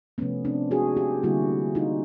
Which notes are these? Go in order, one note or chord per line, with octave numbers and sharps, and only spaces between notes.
C3 F3 A3 B3 C#4
C4 D4
F#4 G#4
F4 G4
D3 G3 A#3 E4 F#4
D#4 F4